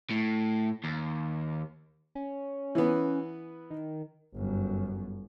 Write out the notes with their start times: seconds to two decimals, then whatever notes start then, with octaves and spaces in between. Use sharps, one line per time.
0.11 A2
0.84 D#2
2.15 C#4
2.75 E3 B3
3.70 D#3
4.35 G1 F#2